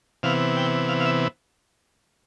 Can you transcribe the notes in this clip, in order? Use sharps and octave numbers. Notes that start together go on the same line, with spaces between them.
C3 E3 B3 F5
G5
F5
F5
E5